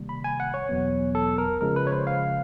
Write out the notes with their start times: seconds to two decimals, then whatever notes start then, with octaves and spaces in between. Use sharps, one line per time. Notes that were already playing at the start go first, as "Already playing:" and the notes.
Already playing: C3 D#3 G3 A#3
0.09 B5
0.24 G#5
0.40 F#5
0.54 C#5
0.69 E2 B2 F#3 B3
1.15 A4
1.38 A#4
1.61 C#3 F3 G#3 A#4
1.76 B4
1.87 C#5
1.92 C5
2.07 F5